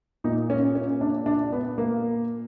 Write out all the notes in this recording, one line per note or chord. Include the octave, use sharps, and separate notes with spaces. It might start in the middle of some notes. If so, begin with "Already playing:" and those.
A#2 D#4
C#4
C#4
D4
D4
B3
A#3